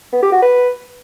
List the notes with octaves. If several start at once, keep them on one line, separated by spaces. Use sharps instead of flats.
B3
G4
F#4
B4